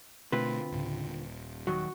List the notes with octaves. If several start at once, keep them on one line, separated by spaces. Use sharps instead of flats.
B2 D3 A3 C4 F4 B4
D2 A2 C#3
D#1
D#3 F#3 F#4